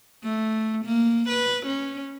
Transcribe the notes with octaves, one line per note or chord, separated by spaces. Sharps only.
A3
A#3
B4
C#4